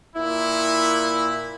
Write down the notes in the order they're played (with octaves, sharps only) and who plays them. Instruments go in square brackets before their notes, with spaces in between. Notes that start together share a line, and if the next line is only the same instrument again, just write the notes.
[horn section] A#2 E4